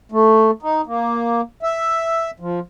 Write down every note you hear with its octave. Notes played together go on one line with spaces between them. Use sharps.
A3
D#4
A#3
E5
F3